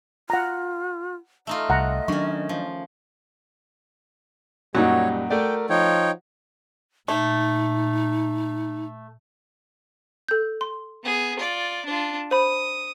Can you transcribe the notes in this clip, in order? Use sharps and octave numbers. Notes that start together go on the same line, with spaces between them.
F4 F#5 A#5
A3 D#4 F4 D#5
C2 F#5 A#5
D#3 F#3 C#4 D4 C#6
F3
F#2 A#2 G3 D#4 F#4 C#5
A3 A#4 D5 G5
F3 D#4 C#5 G5
A#2 A3 D#4
A4 G6
C6
B3 G#4
F4 D5
D4 F4
C5 B5 D#6